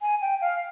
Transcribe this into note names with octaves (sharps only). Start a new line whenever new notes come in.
G#5
G5
F5